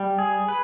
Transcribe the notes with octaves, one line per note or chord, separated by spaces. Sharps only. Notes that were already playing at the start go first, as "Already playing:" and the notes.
Already playing: G3
G#4
B4